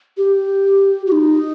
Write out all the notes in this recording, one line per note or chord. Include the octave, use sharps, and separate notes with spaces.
G4
F#4
D#4